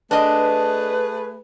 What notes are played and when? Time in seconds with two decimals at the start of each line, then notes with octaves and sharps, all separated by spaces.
0.11 A3 D4 G#4 B4 D#5